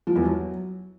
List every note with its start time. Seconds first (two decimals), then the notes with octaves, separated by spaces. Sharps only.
0.07 F3
0.16 E2
0.24 F#3